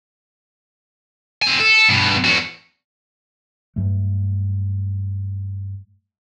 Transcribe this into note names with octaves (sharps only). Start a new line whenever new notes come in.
C4 G#5
A4
G2 B2
E2 F#4
G2 F#3 A3